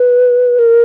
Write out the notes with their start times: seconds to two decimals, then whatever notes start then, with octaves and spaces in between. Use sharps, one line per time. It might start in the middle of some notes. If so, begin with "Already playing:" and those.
Already playing: B4
0.59 A#4